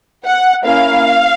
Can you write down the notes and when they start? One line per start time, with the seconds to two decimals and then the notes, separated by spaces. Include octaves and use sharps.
0.25 F#5
0.65 A#3 C#4 E4 F5